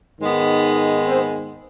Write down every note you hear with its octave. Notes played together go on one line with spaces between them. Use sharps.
G#2 D#3 G#3 B3
C4 C5